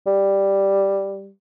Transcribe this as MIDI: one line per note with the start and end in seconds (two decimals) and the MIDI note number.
0.07 1.31 55